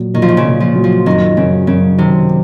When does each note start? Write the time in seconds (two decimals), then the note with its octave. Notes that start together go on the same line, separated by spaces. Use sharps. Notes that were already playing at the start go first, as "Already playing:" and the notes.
Already playing: A#2 F#3
0.14 A#2 D#3
0.22 F3
0.28 D#3
0.37 C#3
0.45 A#2
0.60 F3
0.76 F#3
0.84 F3
1.06 F#2 D#3
1.37 F#2 C#3
1.67 F#2 C#3
1.98 C3 D#3